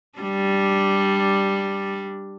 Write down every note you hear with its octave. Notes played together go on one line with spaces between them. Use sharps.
G3 D4